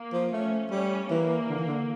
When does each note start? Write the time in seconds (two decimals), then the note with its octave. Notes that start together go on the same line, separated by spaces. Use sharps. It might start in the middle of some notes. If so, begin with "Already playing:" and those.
Already playing: A#3
0.13 F3
0.32 A3 C#4
0.71 G3 C#4
1.09 E3 A#3
1.49 D3
1.58 E3
1.67 D3